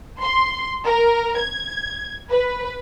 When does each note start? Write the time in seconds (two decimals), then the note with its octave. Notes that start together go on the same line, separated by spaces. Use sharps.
0.20 C6
0.85 A#4
1.39 G#6
2.30 B4